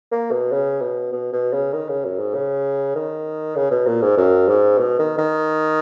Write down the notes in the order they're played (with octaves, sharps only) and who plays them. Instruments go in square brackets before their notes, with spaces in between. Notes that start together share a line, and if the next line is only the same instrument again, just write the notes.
[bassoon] A#3
B2
C#3
B2
B2
B2
C#3
D#3
C#3
F#2
G#2
C#3
D#3
C#3
B2
A#2
G#2
F#2
G#2
B2
D#3
D#3